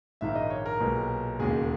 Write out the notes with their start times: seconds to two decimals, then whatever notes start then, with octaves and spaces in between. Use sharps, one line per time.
0.21 A#1 G#2 D#3 A#3 E5
0.35 D#5
0.50 C#5
0.66 A#4
0.80 B1 A#2 G#3 B3
1.39 E1 D#2 C#3 G#3 G#4